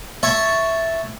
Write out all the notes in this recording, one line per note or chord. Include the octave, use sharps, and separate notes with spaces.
C#5 E5 A5